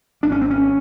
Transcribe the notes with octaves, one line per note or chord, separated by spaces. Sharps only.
G#1 D4
C#4
C4
C#4